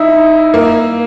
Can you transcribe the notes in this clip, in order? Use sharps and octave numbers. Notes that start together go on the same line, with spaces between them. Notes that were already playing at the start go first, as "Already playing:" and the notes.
Already playing: D#4 E4
A#3